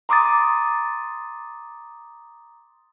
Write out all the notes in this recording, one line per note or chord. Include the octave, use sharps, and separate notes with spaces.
A#5 C6 D6 D#6 A6